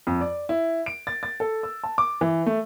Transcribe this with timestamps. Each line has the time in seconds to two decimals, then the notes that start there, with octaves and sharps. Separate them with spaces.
0.07 F2
0.21 D5
0.49 E4
0.86 D7
1.07 A6
1.23 A6
1.40 A4
1.63 E6
1.84 A5
1.98 D6
2.21 E3
2.46 A3